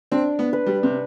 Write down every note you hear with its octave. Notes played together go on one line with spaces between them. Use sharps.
C4 D4
B3
B4
G3
C3